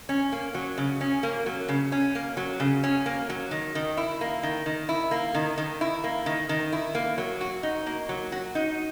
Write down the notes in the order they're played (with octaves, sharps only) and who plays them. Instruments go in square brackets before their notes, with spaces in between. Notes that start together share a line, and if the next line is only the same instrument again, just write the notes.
[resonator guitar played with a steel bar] C#4
A#3
F#3
C#3
C#4
A#3
F#3
C#3
C#4
A#3
F#3
C#3
C#4
A#3
F#3
D#3
D#3
E4
A#3
D#3
D#3
E4
A#3
D#3
D#3
E4
A#3
D#3
D#3
E4
A#3
F#3
F#4
D#4
A#3
F#3
F#4
D#4